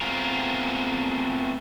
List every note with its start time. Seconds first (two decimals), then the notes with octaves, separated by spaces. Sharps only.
0.01 A3 B3 C4 F4 G#4 A#4